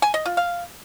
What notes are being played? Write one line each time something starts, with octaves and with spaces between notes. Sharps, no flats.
G#5
D#5
F4
F5